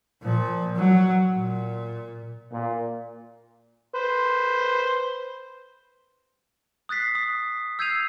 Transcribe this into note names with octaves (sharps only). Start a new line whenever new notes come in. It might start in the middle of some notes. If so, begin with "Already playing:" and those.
A#2 F3
F#3
A#2
A#2
B4 C5
D#6 F#6 A6 B6 C7
D#6
E6 G6 G#6 C7 D#7 F7